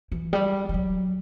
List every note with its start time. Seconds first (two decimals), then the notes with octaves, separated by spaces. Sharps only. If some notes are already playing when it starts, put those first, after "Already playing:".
0.12 E3
0.33 G3
0.69 F3
0.74 F#3